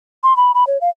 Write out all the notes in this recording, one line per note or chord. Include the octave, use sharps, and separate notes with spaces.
C6
B5
B5
C#5
F5